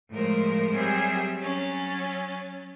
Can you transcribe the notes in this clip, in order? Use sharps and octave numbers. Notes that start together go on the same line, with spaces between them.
A2 F3 G#3 A#4 C5
F#3 G3 C4 G4 G#4 E5
F#3 C#4 A6